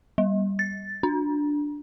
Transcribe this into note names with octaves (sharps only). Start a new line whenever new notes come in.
G3
A6
D4